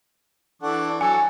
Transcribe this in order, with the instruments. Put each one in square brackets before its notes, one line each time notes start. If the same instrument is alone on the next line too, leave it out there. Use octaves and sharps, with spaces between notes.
[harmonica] E3 C#6 D6 [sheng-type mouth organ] D4 A4 F#5
[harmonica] F#3 A4 [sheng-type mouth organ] C#5 [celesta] G#5